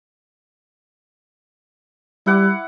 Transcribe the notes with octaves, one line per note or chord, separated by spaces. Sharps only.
G3 E4 F#5 D6